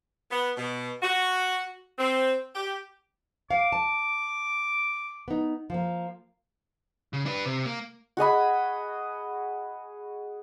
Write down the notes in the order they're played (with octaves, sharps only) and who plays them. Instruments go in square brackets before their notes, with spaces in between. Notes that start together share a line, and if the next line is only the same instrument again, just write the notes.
[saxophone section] B3
B2
F#4
C4
G4
[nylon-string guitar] F5 [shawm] D6
[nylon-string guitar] A5
B3 D#4
F3 A#3
[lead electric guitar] C#3
D4 B4
C3
A#3
[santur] F#4 G#4 D#5 B5